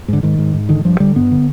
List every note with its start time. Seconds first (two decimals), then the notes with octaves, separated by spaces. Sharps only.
0.08 G#2 D3
0.23 G#2 D#3
0.39 G#2
0.54 G#2
0.69 D3 D#3
0.85 G2 F3
1.00 D3 G3
1.15 G2 B3
1.32 D3